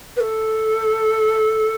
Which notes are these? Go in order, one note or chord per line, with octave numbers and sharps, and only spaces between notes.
B4
A4